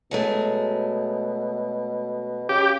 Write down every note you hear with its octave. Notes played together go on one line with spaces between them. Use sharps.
B2 F#3 G#3 A3
C#3 G4